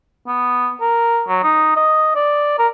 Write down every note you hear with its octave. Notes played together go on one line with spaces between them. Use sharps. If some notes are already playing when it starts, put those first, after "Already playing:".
B3
A#4
F#3
D#4
D#5
D5
A#4